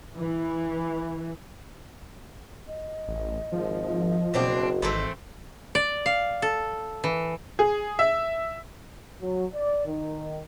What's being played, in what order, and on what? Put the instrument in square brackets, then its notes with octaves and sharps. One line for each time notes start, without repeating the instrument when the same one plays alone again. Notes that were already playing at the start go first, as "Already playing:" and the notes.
[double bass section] E3
[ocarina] D#5
[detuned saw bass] A1
[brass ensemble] G#1 [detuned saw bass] F3
[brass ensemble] F#1 F#4 [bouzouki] B2 C4 D4
[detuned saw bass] G#1 [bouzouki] E3 A3 C4
[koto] D5
F5
A4
E3
[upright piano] G#4
E5
[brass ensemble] F#3
D5
D#3